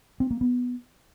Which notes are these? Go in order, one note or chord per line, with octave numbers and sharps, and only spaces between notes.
C4
A#3
B3